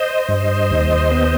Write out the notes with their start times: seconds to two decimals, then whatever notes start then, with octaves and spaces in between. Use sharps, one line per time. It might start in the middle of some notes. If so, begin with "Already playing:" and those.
Already playing: C5 D#5
0.29 G2
0.70 D#2
1.11 B3